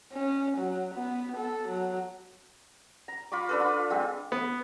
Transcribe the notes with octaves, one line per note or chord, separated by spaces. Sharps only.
C#4
F#3
B3
A4
F#3
A#5
F4 B5 C#6 D6
D4 A4 B4
F4
G#3 C4 F4
B3